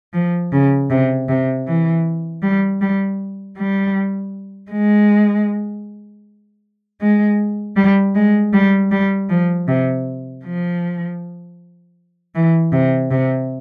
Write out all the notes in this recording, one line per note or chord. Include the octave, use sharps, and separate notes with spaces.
F3
C#3
C3
C3
E3
G3
G3
G3
G#3
G#3
G3
G#3
G3
G3
F3
C3
F3
E3
C3
C3